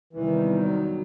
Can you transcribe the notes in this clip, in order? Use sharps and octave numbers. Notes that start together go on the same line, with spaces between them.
E2 C3 D#3 E3 G3
F#3